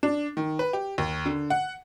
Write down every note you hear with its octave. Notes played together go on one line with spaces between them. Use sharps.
D4
D#3
B4
G4
D#2
D3
F#5